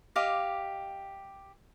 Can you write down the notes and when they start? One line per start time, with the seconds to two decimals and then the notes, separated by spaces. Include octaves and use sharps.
0.16 G4 D#5 F5 D6